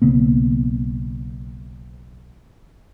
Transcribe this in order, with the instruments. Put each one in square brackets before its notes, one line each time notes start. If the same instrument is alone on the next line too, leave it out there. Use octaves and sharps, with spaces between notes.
[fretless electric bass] B1 C#3 A#3 B3